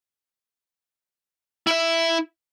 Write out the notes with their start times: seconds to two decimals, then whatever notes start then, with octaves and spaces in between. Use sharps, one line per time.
1.67 E4 E5